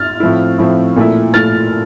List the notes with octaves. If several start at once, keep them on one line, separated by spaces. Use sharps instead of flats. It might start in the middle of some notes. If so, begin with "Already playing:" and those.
Already playing: F6 A6
A2 F3 C4 E4
A2 F3 C4 E4
A#2 A3 E4
A#2 A3 E4 F6 A6